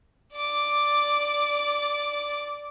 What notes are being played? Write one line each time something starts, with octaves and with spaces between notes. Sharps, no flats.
D5 D6